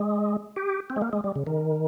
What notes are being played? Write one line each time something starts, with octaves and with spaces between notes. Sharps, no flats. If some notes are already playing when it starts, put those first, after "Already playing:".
Already playing: G#3
G4
C4
G#3
A#3
G#3
G3
C#3
D#3